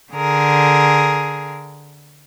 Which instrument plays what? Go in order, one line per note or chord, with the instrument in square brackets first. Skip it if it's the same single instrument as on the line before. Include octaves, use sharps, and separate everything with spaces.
[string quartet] D3 G#4 A#4